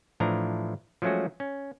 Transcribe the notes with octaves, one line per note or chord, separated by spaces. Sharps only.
A2 E3 F3 D4 A#5
F3 F#3 G#3 A3 C#4 F#4
C#4